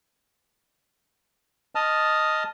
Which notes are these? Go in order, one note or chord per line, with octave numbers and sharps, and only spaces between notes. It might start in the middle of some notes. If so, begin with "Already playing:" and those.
D#5 A5 D#6 F6